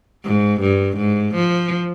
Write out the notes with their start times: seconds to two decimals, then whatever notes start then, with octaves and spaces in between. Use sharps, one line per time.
0.24 G#2
0.61 G2
0.97 G#2
1.35 F3